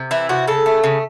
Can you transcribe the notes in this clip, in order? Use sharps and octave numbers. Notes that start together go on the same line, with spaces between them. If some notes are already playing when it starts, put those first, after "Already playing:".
Already playing: C3
E3 E4
C3 F#4
C#3 A4
A3
C#3